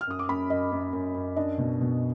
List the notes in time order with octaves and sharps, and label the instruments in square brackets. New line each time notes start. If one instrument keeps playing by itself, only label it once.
[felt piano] F6
F#2 D#6
D6
F#2 B5
F#2 D#5
F#2
F#2
F#2
D4 D#5
B2
B2